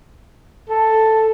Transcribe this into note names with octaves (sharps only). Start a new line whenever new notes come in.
A4